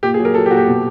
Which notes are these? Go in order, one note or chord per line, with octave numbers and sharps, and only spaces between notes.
A#2 G4
G#4
F#3
A#4
F#3 A4
G4
A#2 F#4
G4
B2